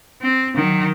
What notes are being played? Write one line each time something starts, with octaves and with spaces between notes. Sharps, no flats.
C4
D#3 F#3